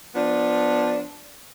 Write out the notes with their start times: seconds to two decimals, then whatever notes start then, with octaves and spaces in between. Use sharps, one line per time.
0.15 F3 B3 D4